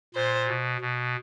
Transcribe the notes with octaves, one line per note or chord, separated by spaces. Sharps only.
A#2 C5
B2
B2